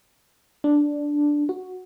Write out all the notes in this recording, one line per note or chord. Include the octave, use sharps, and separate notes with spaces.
D4
F#4